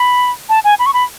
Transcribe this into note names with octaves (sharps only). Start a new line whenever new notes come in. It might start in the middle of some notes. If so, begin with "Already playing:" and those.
Already playing: B5
A5
G#5
B5
C#6
B5